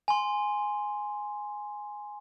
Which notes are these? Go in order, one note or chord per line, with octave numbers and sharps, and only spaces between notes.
G#5 C6